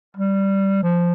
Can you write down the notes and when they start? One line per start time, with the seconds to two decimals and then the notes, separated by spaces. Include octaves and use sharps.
0.17 G3
0.83 F3